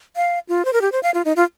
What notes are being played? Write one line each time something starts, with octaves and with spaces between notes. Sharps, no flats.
F5
F4
C5
A#4
G4
C5
F5
F4
D#4
F4